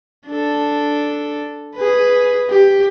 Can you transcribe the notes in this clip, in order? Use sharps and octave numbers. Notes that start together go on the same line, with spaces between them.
D4 A4
G#4 B4
G4